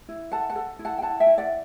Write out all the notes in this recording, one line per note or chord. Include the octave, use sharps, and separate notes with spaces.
E4
A4 F#5 A5
F#5 A5
A4
E4
F#5 A5
G5
E4 F#5 A5
E5 G5
E4
D5 F#5